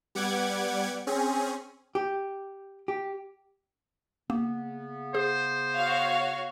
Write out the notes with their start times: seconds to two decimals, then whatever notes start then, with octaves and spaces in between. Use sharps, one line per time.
0.15 G3 B3 F#5 D6 G#6
1.07 C4 C#4 G#4
1.95 G4
2.88 G4
4.30 C#3 A#3 B3
5.15 G#4 C5
5.75 F#4 C#5 F5